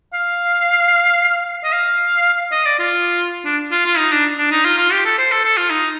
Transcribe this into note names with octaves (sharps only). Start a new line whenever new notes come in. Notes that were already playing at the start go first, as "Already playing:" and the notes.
F5
D#5
F5
D#5
D5
F4
D4
F4
F4
D#4
D4
D4
D#4
F4
F4
G4
A4
C5
A4
A4
F4
D#4